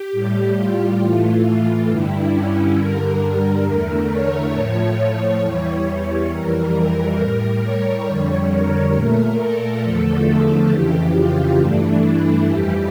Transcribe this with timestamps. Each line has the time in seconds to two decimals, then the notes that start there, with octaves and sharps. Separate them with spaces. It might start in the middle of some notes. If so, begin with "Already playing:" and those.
Already playing: G4
0.12 A2 G3
0.57 F4
1.01 A2 E3 A3 F4
1.89 G2 D3 G3 E4
2.32 C#4
2.77 G2 D3 G3 A#4
3.66 E2 D3 A3
4.10 C#5
4.53 A2 F3 A3 C#5
5.41 E2 E3 G3 C#5
6.30 F2 E3 G3 A#4
6.74 A#4
7.18 A2 G3
7.62 C#5
8.07 F2 D3 G3
8.51 A#4
8.94 A#2 A3
9.38 A4
9.83 E2 D3 F3 A3 A4
10.71 F2 C#3 E3 G4
11.15 F4
11.59 G2 E3 A3 D4
12.03 E4
12.47 F2 E3 G3 G4